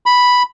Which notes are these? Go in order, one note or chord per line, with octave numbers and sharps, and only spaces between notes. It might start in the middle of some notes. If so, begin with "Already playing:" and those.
B5